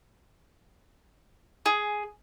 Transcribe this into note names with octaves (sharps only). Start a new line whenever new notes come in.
G#4